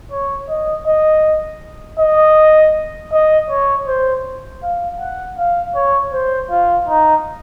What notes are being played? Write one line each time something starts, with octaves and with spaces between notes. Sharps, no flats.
C#5
D#5
D#5
D#5
D#5
C#5
C5
F5
F#5
F5
C#5
C5
F4
D#4